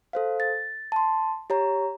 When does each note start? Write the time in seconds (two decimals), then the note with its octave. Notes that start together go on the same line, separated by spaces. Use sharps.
0.13 A4 C5 F5
0.40 A6
0.92 A5 C6
1.50 G4 C#5 A#5